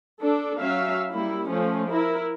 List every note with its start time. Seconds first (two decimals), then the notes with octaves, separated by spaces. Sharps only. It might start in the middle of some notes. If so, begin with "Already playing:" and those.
0.21 D4 A4
0.60 F#3 C#4 E5 F5
1.11 G3 A#3 E4
1.47 F3 A3 C#4
1.90 E4 A#4